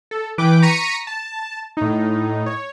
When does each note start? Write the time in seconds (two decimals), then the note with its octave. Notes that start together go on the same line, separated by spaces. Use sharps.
0.11 A4
0.38 E3 B4 G5 D6
0.62 A#5 C#6 A#6 B6 C#7 D#7
1.07 A5
1.77 A2 D#4
2.46 C#5